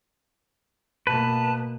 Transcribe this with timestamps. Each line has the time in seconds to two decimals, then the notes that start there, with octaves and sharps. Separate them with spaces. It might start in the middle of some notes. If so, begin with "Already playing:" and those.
1.07 B2 A#3 B4 A5